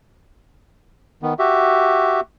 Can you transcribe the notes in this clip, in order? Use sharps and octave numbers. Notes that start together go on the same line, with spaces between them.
D#3 B3
F#4 G4 E5